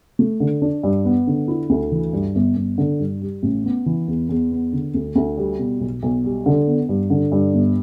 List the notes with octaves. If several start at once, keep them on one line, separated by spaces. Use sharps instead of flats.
A3
D3
D4
G2
B3
D3
E4
D2
E3
G2
G1
G1
D3
G2
G3
A1
B3
E3
E2
E2
B3
D3
D2
D2
G3
B2
B1
B1
G3
D3
B3
G2
D3
G2
G1